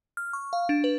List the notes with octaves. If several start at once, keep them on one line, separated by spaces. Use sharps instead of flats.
F6
C#6
F5
D4
B4